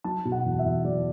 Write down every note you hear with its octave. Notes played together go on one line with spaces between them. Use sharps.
F#3 A5
B2
F#5
E2
E5
E2
F#3 D5